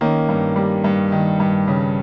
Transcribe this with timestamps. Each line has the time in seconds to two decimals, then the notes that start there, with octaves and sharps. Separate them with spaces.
0.01 D#3 A#3 C#4
0.29 G2
0.56 G3
0.84 G2
1.12 D#3
1.40 G2
1.68 C#3